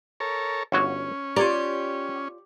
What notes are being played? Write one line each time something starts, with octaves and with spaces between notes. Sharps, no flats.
A4 A#4 C#5
G1 C#4 F#4 C#5
F4 G4 C#5 D5 A#5